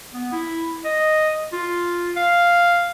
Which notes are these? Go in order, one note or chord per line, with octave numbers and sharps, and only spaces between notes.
B3
E4
D#5
F4
F5